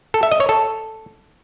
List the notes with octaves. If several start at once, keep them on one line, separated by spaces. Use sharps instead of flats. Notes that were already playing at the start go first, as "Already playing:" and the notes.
A4
E5
D#5
C#5
A4